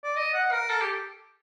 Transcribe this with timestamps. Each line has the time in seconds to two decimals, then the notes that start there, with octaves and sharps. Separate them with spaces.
0.03 D5
0.16 D#5
0.34 F#5
0.52 A#4
0.70 A4
0.82 G4